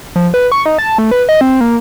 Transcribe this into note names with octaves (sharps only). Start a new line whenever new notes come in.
F3
B4
C#6
D#4
A5
A3
B4
D#5
C4
A#3